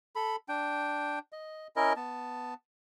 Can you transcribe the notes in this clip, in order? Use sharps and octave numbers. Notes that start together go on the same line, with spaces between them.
A4 B5
D4 G5
D#5
C#4 E4 A#4 D#5
B3 A5